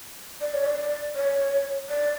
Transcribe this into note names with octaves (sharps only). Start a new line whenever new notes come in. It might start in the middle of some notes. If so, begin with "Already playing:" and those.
D5
C#5
D5
C#5
D5